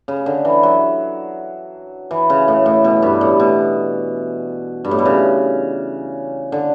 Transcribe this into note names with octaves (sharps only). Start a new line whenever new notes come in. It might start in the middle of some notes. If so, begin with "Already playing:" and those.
C#3
D3
E3
F#3
E3
C#3
A2
A2
B2
G2
A2
B2
G2
A2
B2
C#3
D3